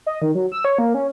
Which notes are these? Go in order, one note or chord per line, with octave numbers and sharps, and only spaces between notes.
D#5
D#3
F#3
E6
C#5
A#3
C#4